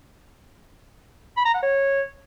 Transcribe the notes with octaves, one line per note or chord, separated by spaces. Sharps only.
B5
A#5
F#5
C#5